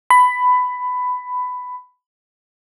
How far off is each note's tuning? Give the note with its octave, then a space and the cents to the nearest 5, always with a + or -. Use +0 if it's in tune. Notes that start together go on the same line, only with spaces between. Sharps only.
B5 +15